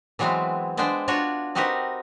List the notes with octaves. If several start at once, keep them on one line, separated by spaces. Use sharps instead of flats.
E3 F#3 G#3 B3 C4
G#3 B3 D4 C5 G5
D4 F4 F#4 C#5
C4 D#4 F#4 G4 A#4 B4